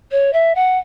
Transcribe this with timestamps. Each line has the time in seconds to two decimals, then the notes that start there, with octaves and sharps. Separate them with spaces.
0.11 C#5
0.33 E5
0.55 F#5